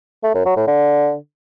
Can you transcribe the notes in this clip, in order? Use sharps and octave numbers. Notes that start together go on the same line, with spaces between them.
A3
F#2
F#3
A2
D3